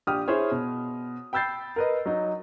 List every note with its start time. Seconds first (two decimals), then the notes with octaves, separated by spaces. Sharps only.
0.07 A#1 G4 D#6 F6
0.28 E4 G#4 C5 C#5
0.52 B2
1.33 G5 B5 E6 G6 A6 C7
1.76 A#4 B4 D#5
2.06 F#3 D#4